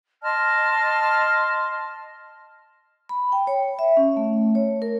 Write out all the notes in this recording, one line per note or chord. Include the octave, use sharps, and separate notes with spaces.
D#5 A5 C6 F6
B5
G5
C#5
E5
C#4
A3
C#5
A#4